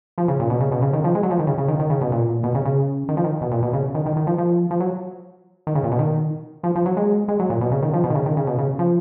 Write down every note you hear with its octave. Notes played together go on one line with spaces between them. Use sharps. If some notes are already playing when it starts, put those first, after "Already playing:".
F3
C#3
A#2
B2
C#3
B2
C#3
D#3
F3
G#3
F#3
F3
D#3
C#3
C#3
D#3
D#3
C#3
B2
A#2
B2
C#3
C#3
D#3
F3
D#3
B2
A#2
B2
C#3
D#3
D#3
D#3
F3
F3
F3
F#3
D#3
C#3
A#2
B2
D#3
F3
F3
F#3
G#3
G#3
F#3
A#2
B2
C#3
D#3
F3
B2
D#3
C#3
D#3
C#3
B2
C#3
F3